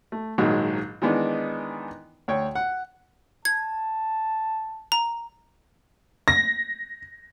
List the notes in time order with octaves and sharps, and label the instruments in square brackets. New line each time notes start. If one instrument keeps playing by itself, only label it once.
[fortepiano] A3
A#1 G#2 D#3 F#3 G#3
D#3 E3 G#3 B3 D4 D#4
D2 C#5 G5
F#5
[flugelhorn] A5 [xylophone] G#6
[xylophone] A#5
[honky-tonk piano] A#6